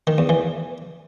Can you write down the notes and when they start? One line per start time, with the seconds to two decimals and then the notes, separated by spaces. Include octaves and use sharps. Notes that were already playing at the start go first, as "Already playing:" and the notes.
0.07 D#3
0.18 E2
0.29 E3